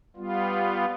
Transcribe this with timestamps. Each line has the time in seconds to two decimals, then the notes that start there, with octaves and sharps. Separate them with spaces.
0.17 G3 B3 F4